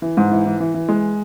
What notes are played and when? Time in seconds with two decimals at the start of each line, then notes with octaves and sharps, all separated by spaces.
0.02 E3
0.17 G#2
0.31 E3
0.46 E3
0.60 E3
0.74 E3
0.89 G#3